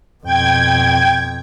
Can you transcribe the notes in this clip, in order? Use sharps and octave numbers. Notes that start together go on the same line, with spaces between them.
F2 B2 G5 G#6